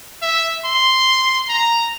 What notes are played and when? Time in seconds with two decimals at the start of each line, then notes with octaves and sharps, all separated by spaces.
0.22 E5
0.65 C6
1.49 A#5